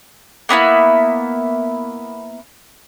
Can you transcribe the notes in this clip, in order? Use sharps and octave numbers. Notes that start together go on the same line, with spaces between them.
A#3 B3 D4 E4